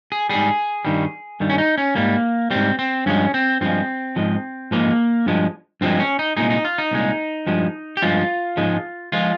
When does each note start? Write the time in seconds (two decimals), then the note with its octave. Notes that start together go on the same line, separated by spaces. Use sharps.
0.12 G#4
0.29 G#2 G3 G#4
0.85 G2 D#3 G3
1.40 G2 D#3 G3
1.50 C#4
1.58 D#4
1.78 C#4
1.96 G#2 G3 A#3
2.51 G#2 G3 C4
2.79 C4
3.06 G2 F3 G#3 C#4
3.34 C4
3.61 G2 F3 G#3 C4
4.16 G#2 F3 G#3
4.71 G#2 F3 G#3 A#3
5.26 G2 F3 G#3
5.81 G2 F3 G#3 C4
6.00 C#4
6.19 D#4
6.37 C2 A#2 G#3 D#4
6.50 D#4
6.65 F4
6.78 D#4
6.91 C2 A#2 G#3
7.47 G2 F3 G#3
7.97 G4
8.02 G2 F3 G#3 F4
8.57 G#2 F3 G#3
9.12 F3 G#3 F4